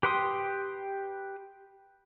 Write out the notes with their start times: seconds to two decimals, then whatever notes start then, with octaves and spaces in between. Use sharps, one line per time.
0.03 G4 B4 G5 C6 D#6